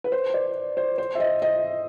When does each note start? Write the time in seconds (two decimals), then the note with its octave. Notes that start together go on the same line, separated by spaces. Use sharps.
0.04 B4
0.12 C5
0.34 D5
0.77 C5
0.98 C5
1.15 E5
1.20 D#5
1.42 D#5